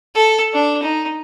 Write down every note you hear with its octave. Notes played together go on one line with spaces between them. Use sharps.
A4
D4
D#4